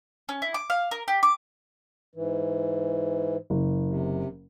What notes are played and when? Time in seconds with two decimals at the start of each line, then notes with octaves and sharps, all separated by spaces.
0.29 C#4
0.42 E4
0.54 D6
0.70 F5
0.91 A#4
1.08 G4
1.23 D6
2.15 G#2 E3
3.50 F#1
3.87 C3